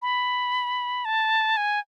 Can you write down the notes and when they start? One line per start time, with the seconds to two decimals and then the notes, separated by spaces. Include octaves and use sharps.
0.02 B5
1.05 A5
1.57 G#5